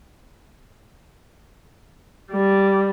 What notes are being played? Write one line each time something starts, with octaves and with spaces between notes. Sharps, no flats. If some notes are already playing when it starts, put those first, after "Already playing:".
G3